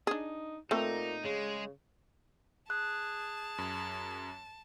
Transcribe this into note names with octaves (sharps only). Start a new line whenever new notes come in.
D4 D#4 G#4
A#2 A3 C4 D#4 A4
C#3 G#3
G#4 A5 F#6
F#2